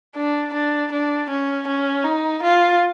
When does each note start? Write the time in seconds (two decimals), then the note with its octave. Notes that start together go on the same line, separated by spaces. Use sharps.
0.16 D4
0.54 D4
0.92 D4
1.29 C#4
1.67 C#4
2.04 D#4
2.42 F4